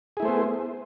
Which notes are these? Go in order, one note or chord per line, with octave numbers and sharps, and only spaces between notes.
A3 B3 E4 G#4 C5